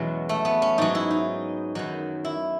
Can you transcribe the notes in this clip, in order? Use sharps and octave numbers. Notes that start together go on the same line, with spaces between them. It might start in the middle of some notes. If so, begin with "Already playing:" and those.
Already playing: E2 B2 F#3 G#3 B3 C#4
A3
B3
C#4
G#2 F#3 D#4
E4
D#4
F#2 D#3 F#3
E4